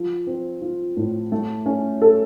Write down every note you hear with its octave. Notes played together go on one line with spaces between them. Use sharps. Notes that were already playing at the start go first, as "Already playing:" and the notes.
Already playing: F3
C4
F4
A2
A3
C#4
A4